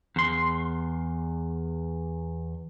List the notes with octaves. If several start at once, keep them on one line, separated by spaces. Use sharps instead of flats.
E2 C6